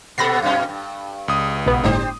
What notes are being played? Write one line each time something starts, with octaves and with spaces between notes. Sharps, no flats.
A#2 B3 A4 B5 A#6 C7
F#2 B2 C#4
G2
C#2 D#6
B1 B3
G1 A2 D4 G4 C5